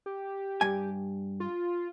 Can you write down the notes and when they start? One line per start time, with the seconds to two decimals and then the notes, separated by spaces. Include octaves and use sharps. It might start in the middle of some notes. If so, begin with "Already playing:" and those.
0.06 G4
0.61 G2 G#5
1.40 F4